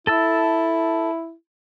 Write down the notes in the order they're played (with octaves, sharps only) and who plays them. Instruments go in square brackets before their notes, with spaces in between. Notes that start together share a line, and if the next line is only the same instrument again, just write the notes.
[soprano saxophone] E4 [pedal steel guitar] A4 A5 E6